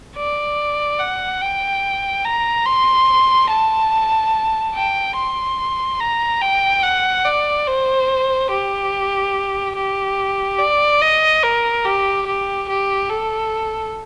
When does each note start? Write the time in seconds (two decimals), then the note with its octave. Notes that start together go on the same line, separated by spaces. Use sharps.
0.16 D5
0.99 F#5
1.41 G5
2.25 A#5
2.66 C6
3.50 A5
4.75 G5
5.16 C6
6.00 A#5
6.41 G5
6.83 F#5
7.25 D5
7.68 C5
8.50 G4
9.76 G4
10.59 D5
11.02 D#5
11.43 A#4
11.84 G4
12.27 G4
12.69 G4
13.10 A4